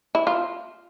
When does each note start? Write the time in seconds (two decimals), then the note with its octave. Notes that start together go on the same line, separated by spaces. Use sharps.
0.15 E4
0.27 F4